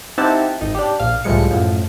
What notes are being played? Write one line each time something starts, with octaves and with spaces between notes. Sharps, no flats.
C4 D#4 E4 G4 F#5 A5
G#1 D#4
D4 G4
A#1 F5
C#2 A2 F3 G3 G#3 C#7
F#2 A2 F3